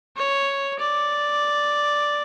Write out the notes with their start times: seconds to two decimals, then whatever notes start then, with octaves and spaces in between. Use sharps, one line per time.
0.16 C#5
0.79 D5